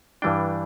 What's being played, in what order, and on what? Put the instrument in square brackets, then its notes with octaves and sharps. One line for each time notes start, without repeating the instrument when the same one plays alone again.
[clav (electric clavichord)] G2 E3 G3 D4 G5